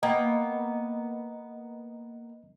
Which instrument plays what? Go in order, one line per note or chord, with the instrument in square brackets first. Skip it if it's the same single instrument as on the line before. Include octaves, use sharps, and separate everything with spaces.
[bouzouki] A#3 B3 G5 [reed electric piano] D#5